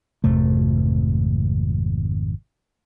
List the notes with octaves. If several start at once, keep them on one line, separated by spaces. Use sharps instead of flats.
G#1 F2 C3 A3